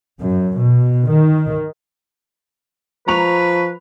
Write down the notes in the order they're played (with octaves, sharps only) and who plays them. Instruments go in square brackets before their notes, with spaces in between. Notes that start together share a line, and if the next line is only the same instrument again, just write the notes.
[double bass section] F#2
B2
D#3
[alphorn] F3 [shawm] B4 [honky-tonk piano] A#5 C#6 F7